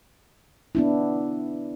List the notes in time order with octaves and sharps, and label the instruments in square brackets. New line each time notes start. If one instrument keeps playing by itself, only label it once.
[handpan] B3 D4 E4